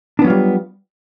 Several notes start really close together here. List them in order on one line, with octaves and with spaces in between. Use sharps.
D4 B3 F#3 F4 G3